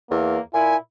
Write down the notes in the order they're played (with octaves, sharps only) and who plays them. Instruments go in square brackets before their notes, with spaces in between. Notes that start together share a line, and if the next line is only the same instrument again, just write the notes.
[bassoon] E2 [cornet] A#3
[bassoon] A#2 [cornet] E4 [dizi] G#5